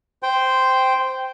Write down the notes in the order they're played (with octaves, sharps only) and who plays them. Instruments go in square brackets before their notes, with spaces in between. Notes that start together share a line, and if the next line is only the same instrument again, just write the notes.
[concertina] C5 G5